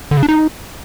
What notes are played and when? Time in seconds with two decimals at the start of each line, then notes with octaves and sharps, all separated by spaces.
0.11 D3
0.17 C#3
0.23 D4
0.29 D#4